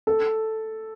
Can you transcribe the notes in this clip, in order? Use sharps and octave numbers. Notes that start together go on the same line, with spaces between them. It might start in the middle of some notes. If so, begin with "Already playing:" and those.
A4